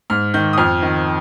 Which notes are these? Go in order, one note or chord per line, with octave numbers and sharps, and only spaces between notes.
G#2 F6
D#3 G6
D#6
F2 F6
D#3